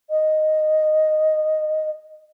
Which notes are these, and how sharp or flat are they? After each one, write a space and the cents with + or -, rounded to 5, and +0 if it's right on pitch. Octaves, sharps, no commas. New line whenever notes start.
D#5 -5